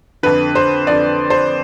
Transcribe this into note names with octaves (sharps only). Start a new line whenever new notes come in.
F2 D3 B4
C5
F2 D3 D5
C5